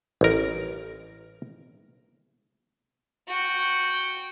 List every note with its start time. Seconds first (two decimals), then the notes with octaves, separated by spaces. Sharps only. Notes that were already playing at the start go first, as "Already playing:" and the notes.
0.21 A1 A#4
3.29 F#4 G5